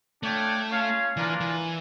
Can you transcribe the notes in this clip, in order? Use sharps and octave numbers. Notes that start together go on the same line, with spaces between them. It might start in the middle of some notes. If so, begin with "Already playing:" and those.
A3 D4 F4 C#5 G5
C#4 F4 C#5 F5
E3 A#3 D4 F4 A#4 D5
E3